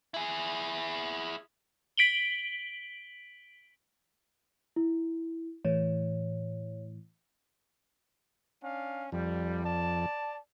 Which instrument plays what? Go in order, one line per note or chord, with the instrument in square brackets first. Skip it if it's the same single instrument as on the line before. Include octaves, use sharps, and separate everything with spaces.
[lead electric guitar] E4 G#4
[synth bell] B6 D7 F#7 G7
[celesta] E4
[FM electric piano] A2 E3 [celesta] C#5
[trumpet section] C#4 D4 F5
[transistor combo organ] F2 [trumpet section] G3
[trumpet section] D5 A5